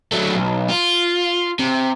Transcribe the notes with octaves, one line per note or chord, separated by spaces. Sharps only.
F#3 A3
B1
F4
C3